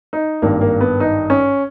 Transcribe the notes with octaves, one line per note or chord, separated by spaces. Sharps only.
D#4
G#1 G2 D#3 A#3
A#3
B3
D#4
C#4